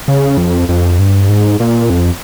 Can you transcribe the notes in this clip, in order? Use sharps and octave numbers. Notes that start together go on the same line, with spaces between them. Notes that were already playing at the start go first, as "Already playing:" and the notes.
C#3
F2
F2
G2
G#2
A#2
F2